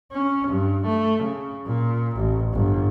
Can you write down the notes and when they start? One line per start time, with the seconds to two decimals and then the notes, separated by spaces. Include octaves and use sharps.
0.12 C#4
0.47 G2
0.86 A3
1.23 C#3
1.66 A#2
2.17 A1
2.53 G1